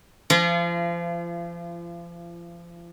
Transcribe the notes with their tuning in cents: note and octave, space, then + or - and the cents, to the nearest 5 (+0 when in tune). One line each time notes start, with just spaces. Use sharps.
F3 -30 F4 -40